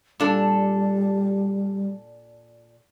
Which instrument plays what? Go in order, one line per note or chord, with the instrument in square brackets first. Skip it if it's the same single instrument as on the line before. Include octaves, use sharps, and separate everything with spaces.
[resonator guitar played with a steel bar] A#2 D4 A4 [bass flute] G3